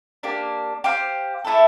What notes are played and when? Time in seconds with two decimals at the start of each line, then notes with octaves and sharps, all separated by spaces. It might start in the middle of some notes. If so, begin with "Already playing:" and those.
0.23 A#3 D4 G4
0.84 G4 C5 F5
1.45 A3 E4 A4